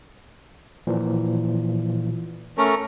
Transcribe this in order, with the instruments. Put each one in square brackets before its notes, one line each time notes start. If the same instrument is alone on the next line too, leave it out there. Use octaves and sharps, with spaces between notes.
[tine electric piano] A#2 E3 F3
[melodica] A3 C#4 A#4